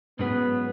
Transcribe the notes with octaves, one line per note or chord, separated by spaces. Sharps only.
G#2 F#3 B3 C#4 G#4 B4